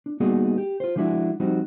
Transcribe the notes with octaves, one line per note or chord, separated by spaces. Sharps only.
D4
G3 A#3 B3 D#4 F#4 G#4
G4
F4 C5
F3 G#3 D4 E4 F#4
F3 G3 C4 D#4 F#4